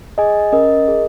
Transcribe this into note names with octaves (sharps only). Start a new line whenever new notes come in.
G#4 D#5 G#5
C#4 A#4 D#5
G#4